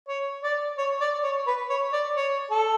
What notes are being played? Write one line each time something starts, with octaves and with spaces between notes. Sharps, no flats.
C#5
D5
C#5
D5
C#5
B4
C#5
D5
C#5
A4